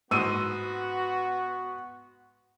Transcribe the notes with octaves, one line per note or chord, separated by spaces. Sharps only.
G#2 B3 F#4 E6 D#7